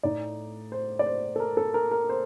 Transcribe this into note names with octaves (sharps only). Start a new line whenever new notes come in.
A2 A3 D#4 D5
C5
D5
C5
A4
A#4
A4
A#4
A#4
C5